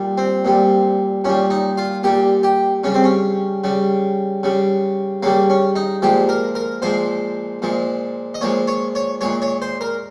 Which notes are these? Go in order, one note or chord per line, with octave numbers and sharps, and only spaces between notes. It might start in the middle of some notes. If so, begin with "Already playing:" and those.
Already playing: A#2 G3
C4
A#2 G3
A#2 G3 C#4
D#4
F4
A#2 G3 G4
G4
C#3 G3 C#4
C4
C#4
C#3 G3
C#3 G3
C#3 G3 A#3
C#4
D#4
A#2 F3 G#3 G4
A#4
A#4
A#2 F3 G#3 C5
A#2 F3 G#3
D#5
A#2 F3 G#3 C#5
C#5
C#5
A#2 G#3 C#5
C#5
C5
A#4